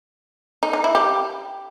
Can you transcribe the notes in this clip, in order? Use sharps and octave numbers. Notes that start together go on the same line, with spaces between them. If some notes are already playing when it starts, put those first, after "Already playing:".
D#4
D#4
E4
G4